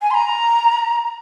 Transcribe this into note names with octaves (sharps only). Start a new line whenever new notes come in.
G#5
C6
A#5